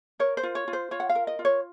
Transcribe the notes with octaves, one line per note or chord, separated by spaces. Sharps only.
A#4 C#5
C5
F4
C#5
F4
C5
F4 C#5
F#5
F5
A#4
D#5
F4
C#5